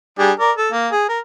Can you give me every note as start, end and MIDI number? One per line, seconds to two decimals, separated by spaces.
0.19 0.32 55
0.19 0.32 62
0.19 0.32 68
0.40 0.51 70
0.40 0.51 74
0.57 0.70 69
0.72 0.89 58
0.92 1.06 68
1.09 1.19 70